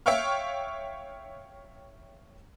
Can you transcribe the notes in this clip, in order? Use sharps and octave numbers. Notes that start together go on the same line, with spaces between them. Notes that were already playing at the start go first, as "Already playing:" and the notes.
C#5 E5 F5 G5 C#6 F6